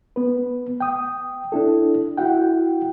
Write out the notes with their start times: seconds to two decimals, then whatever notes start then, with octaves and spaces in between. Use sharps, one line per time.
0.16 B3 B4
0.80 G5 D#6
1.52 D4 E4 A4
2.17 E4 F#4 F#5 G5